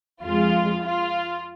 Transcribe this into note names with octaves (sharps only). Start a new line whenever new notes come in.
F2 F3 G#3 F4
F4